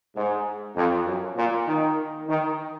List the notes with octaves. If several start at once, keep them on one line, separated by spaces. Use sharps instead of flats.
G#2
F2
F#2
A#2
D#3
D#3